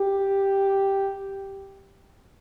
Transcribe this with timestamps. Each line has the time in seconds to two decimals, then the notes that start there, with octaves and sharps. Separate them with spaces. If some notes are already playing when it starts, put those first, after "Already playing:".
Already playing: G4